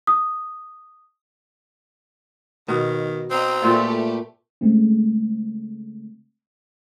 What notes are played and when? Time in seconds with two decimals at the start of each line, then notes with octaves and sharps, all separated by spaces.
0.07 D#6
2.68 B2 D#3
3.31 C4 D#5 G5 A#5
3.62 A#2 A3 F4 G4 B4 D5
4.61 C#3 G#3 A3 C4